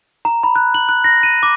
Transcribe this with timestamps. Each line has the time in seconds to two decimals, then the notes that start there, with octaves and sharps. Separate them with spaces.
0.25 A#5
0.43 B5
0.56 F#6
0.74 F#7
0.89 F#6
1.04 A#6
1.23 D#7
1.43 D6